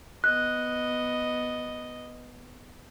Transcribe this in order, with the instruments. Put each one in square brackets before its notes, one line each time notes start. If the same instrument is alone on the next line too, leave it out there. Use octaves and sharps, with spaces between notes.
[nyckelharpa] B3 D#5 [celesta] F#6